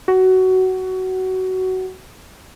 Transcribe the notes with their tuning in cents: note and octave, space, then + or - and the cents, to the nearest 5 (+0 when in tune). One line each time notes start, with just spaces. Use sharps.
F#4 +15